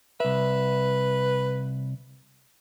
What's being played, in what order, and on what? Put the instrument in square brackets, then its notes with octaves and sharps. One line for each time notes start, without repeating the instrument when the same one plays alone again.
[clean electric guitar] C2 E5 [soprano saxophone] B4